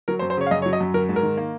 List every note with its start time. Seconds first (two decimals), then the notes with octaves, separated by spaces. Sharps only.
0.08 F#3 A#4
0.19 C5
0.22 F#2
0.30 C5
0.37 C#3 C#5
0.46 F5
0.51 F#2 D#5
0.62 C#5
0.66 F#3
0.73 D#5
0.80 F#2
0.94 F#3 A#4
1.09 G#2
1.16 A#4
1.23 D#3
1.37 A#3